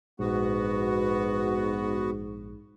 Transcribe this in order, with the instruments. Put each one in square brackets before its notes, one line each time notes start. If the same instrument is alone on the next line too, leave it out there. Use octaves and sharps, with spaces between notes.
[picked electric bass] A#1 [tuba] G#2 [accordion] B3 F#4